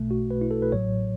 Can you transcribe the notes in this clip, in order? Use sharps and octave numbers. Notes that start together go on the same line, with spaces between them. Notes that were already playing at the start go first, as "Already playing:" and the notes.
Already playing: B1 B2 A3
F#4
B4
E4
A4
B4
A1 A2 F#3 C#5